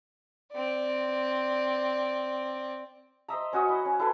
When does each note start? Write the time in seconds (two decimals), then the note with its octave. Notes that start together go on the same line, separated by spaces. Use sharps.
0.52 C4 D5
3.28 C5 D#5 E5 A#5
3.53 C#4 F#4 D#5
3.69 E4
3.85 C#4
3.99 E4 A4 B4 C5